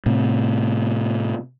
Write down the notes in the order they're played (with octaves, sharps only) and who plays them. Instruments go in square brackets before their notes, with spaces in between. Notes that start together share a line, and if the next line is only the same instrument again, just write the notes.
[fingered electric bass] A2 C3